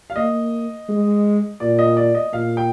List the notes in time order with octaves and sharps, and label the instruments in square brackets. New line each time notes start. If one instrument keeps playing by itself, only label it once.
[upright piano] F5
[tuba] A#3 [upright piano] D#5
[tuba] G#3
[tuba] A#2 [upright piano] D5
[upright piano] D#5
D5
D#5
[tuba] A#2 [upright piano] F5
[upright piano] G5